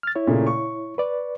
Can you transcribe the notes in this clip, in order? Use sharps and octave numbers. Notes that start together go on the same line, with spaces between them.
F6 A6
E4 C#5
A#2 C#3 A3
C#6
B4 D5